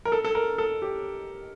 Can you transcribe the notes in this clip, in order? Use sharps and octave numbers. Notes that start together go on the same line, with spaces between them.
A#4
A4
A4
A#4
A4
G4